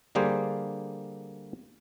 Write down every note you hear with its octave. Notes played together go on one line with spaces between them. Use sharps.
D3 G3 A#3 G#4 C5